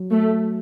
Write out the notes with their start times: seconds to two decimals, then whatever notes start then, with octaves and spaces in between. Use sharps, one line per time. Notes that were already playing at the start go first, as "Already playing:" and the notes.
Already playing: F#3
0.11 A3